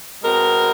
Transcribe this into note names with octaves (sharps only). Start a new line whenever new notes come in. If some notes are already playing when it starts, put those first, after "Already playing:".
B2 G#3 C4 A#4